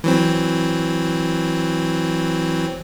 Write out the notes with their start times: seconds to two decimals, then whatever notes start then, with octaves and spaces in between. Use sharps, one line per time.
0.04 E3 F#3 C4